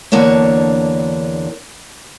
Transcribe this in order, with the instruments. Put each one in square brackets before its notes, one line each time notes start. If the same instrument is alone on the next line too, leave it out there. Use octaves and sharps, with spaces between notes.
[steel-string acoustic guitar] E2 D3 A#3 D4 C#5